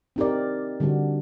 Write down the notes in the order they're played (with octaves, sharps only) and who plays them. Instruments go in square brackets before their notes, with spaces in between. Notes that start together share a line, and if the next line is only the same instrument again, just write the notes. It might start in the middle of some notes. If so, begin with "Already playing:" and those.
[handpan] C4 D#4 G4 A#4 D5
D3 G3 D4 F#4